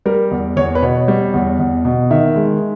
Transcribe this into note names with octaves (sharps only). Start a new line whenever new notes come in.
G3 A#4
E2
E2 C#5
B4
B2 C#5
G3
E2
E2
B2
D#3 E5
G#3